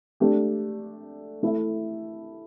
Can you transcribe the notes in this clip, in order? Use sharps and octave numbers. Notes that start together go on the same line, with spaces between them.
A3 D4 G4
A3 E4 A4 E5